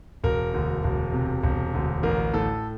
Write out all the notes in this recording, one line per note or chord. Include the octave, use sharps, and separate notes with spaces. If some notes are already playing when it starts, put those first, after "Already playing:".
E1 A#4
D2
E1
C3
E1
D2
A1 A#4
A2 A4